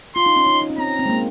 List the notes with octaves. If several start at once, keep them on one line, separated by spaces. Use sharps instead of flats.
F4 C6
D#4
C#4
D#4
D#4
C#4
C4 A#5
C4
G#3
A#3